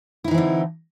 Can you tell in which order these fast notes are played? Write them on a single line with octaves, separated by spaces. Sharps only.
E4 D#4 E3 C4 D3